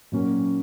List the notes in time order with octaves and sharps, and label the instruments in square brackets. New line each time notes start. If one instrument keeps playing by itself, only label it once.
[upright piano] A#2 F#3 A#3 C#4